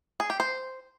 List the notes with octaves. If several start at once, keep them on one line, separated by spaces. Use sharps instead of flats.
G#4
G4
C5